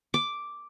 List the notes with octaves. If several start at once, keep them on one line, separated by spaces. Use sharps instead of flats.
D6